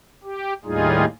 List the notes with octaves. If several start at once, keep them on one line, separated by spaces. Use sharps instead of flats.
G4
D#2 A2 G3 D#4 F4 G#4